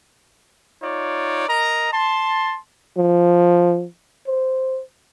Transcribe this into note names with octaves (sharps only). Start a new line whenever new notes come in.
D#4 F4 C#5 D5
A#4 D#5 A#5
A5 C6
F3
C5